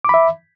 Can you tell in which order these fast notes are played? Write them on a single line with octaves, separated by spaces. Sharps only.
D6 B5 E5